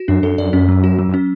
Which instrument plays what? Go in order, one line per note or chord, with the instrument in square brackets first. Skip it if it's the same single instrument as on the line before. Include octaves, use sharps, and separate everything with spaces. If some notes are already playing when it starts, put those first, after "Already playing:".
Already playing: [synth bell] F#4
[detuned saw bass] F#2 [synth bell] D4
[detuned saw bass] F#2 [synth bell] A4
[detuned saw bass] F#2 [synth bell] D5
[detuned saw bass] F#2 [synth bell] C#4
[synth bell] F#3
F#4
F#3
[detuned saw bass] F#2
[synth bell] C#4